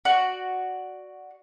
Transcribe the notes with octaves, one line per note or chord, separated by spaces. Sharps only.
F#4 D5